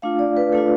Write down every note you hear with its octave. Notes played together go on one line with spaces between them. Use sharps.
A3 D4 F4 F5
D5
B4
A3 D4 F4 A4